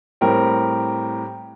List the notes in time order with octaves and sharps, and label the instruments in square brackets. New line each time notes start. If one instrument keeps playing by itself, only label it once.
[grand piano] A2 G3 C4 G4 A#4